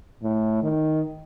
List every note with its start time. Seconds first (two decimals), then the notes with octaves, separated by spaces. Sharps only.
0.23 A2
0.62 D#3